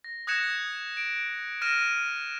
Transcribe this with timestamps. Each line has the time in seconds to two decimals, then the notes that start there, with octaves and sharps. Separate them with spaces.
0.04 A#6
0.27 D#6 F#6 G#6 A#6 C#7 E7
0.97 D7
1.62 F6 A#6 D#7 E7